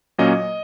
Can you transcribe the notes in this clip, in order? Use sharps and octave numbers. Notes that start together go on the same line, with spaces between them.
A#2 F#3 A#3 C#4 D#5